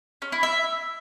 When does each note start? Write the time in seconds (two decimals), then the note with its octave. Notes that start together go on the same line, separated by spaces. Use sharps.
0.22 C#4
0.32 E4
0.43 E5